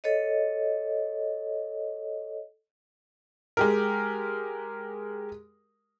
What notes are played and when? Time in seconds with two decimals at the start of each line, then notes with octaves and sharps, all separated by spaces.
0.04 A4 C#5 D#5
3.57 G#3 G4 A#4